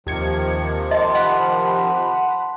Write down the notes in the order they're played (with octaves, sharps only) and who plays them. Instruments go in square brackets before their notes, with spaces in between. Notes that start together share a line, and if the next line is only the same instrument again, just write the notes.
[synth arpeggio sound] D#2 G#6 C#7 [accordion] C3 D#3 F3
[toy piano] D#5 [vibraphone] A5 C6
[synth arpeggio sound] F#5 B5